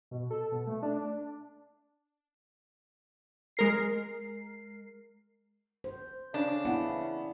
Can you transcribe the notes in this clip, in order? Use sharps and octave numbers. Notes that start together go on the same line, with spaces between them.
B2
A4
B2
A3
D4
G#3 A#4 C7
C5
C#3 D4
B3 E4